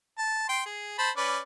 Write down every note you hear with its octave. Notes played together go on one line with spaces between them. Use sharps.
A5
G5 C6
G#4
C5 A5 B5
C#4 B4 D5